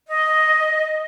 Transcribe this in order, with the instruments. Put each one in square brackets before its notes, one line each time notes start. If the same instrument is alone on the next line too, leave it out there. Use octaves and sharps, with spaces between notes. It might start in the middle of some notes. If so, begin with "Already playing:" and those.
[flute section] D#5